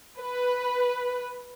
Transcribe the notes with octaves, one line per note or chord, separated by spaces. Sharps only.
B4